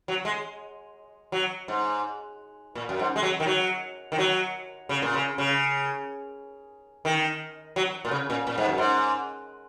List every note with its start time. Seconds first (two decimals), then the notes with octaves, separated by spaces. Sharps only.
0.08 F#3
0.25 G#3
1.32 F#3
1.68 G#2
2.75 A#2
2.89 F#2
2.99 G#2
3.16 G#3
3.23 F#3
3.40 D#3
3.47 F#3
4.12 D#3
4.18 F#3
4.89 C#3
5.02 A#2
5.14 C#3
5.38 C#3
7.05 D#3
7.76 F#3
8.05 A#2
8.11 C#3
8.30 A#2
8.47 A#2
8.58 G#2
8.68 F#2
8.78 G#2